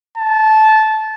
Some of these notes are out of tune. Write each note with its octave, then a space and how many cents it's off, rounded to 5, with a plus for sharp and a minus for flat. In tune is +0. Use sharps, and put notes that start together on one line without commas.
A5 -15